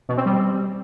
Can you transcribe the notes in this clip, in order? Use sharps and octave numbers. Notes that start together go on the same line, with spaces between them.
B2
C4
G3